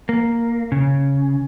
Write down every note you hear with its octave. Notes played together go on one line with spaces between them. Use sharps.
A#3
C#3